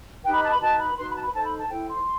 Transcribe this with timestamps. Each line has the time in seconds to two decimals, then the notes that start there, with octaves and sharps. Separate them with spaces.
0.24 D#4 G4 B4 G5
0.33 B5
0.42 A5
0.52 B5
0.60 D#4 F#4 B4 A5
0.79 B5
0.97 D#4 F#4 B4 C6
1.09 B5
1.16 A5
1.21 B5
1.33 D#4 A4 C5 A5
1.45 B5
1.57 A5
1.69 E4 A4 C5 G5
1.88 C6